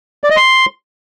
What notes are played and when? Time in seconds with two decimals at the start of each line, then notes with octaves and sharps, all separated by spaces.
0.24 D5
0.30 D#5
0.36 C6